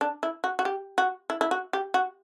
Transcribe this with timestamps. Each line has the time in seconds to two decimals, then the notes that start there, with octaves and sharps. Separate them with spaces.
0.01 D4
0.23 E4
0.44 F#4
0.59 F#4
0.65 G4
0.98 F#4
1.30 E4
1.41 E4
1.51 F#4
1.73 G4
1.94 F#4